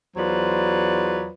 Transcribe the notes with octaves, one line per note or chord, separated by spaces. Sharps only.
E2 F#3 F4 B4 C5 D5